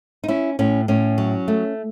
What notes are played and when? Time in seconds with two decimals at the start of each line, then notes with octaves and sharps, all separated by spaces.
0.24 D#4
0.28 C#4 E4
0.59 A2 C#4
0.88 A2 C#4
1.18 F#3
1.48 A3